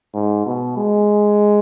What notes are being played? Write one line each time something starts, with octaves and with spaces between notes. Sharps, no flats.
G#2
B2
G#3